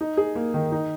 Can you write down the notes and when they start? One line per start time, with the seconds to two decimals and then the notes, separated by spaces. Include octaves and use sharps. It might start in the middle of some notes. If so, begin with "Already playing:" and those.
0.01 D#4
0.17 G#4
0.35 A#3
0.54 D#3
0.72 D#4